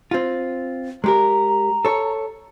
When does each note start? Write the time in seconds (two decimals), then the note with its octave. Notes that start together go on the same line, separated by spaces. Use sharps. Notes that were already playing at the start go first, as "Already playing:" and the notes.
0.11 C4 F4
1.04 G#3 G4 A#4 A#5
1.85 A4 C#5